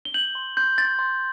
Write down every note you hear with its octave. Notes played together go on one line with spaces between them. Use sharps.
G7
G6 F#7
C6
C6 G6
C6 A6
C6